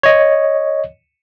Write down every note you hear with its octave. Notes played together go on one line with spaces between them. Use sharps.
C#5 D#5